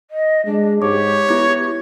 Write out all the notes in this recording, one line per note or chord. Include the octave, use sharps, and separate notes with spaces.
D#5
G#3 D4
G#2 G4 C#5 D6
B3 E4 G#6